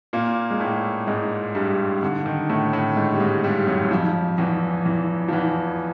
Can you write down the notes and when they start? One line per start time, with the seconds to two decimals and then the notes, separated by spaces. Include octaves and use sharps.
0.13 A#2 A#3
0.50 G#3
0.60 A2 A3
1.07 G#2 G#3
1.55 G2 G3
2.03 D3
2.26 D#3
2.49 A2 A3
2.73 A2 A3
2.96 G#2 G#3
3.14 G3
3.20 G#2 G#3
3.44 G2 G3
3.67 F#2 F#3
3.91 F2 F3
4.38 E2 E3
4.86 E2 E3
5.28 F3
5.33 E2 E3